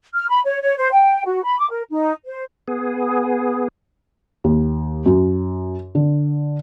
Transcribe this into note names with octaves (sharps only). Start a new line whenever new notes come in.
F6
B5
C#5
C#5
C5
G5
F#4
B5
D6
A#4
D#4
C5
B3 G#4
D#2
F#2
D3